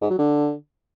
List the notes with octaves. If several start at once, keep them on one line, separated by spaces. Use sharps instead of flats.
G#2
F#3
D3